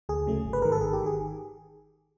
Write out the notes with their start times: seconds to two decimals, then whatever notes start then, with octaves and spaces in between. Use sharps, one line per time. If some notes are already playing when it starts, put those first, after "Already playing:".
0.09 D2 G#4
0.27 C#3 F#3 A3
0.45 G#1
0.53 B4
0.62 G#2 D#3 A#4
0.72 A4
0.81 G#1 G#4
0.93 G4
1.03 D#3 G#4